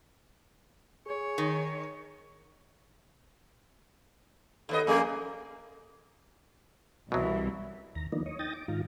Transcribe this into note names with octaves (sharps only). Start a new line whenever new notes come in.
G#4 C#5
D#3
D#2 B3 A4 D#5
F2 A#3 G#4
C2 B2 E3 F#3 E5
D#2 A#5
D#3 F3 A#3 B3 D4 D#4
C#5 D#5
D#4 G5 D#6 A6 A#6
D6
G#2 D#3 F4 A#5